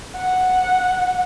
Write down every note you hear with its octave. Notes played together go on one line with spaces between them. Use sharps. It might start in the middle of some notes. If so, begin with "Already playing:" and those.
F#5